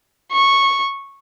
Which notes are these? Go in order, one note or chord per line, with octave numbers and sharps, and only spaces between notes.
C#6